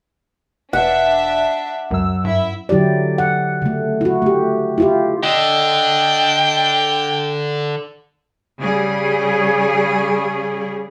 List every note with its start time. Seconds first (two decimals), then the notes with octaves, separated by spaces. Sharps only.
0.73 E1 D4 E5 F#5
1.91 C#2 F#2 F#3 E6
2.25 G2 E4 E5
2.69 D3 F#3 E4 G4 D5
3.18 F#5
3.62 C#3 A3
4.01 E4 F#4
4.22 A3 G4
4.78 E4 F4 G4
5.23 D3 D#5 G5
8.59 C#3 G3 G#4